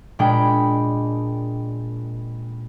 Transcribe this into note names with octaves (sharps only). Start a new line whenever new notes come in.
A#2 G#3 D4 G5 B5